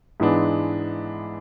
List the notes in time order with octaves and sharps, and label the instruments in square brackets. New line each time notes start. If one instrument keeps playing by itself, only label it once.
[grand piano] G#2 E3 G#3 B3 D4